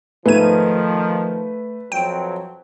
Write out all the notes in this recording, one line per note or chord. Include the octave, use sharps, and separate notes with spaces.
G#2 D#3 F3 A3 B4 G#6 D#7
F2 F#3 C4 G5